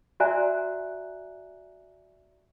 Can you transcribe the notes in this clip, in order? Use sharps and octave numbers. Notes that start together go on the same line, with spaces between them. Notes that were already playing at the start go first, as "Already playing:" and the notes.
F#4 D5 E5 G#5 A#5 F#6